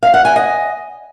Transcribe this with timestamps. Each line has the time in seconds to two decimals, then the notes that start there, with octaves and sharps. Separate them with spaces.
0.03 F5
0.14 F#5
0.25 G#5
0.36 D#5